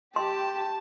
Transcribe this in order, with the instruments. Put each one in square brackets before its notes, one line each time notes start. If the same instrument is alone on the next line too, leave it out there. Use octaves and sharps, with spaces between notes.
[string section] G4 [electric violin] A5 [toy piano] C6